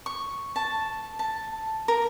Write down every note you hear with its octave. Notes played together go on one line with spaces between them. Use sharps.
C#6
A5
A5
A#4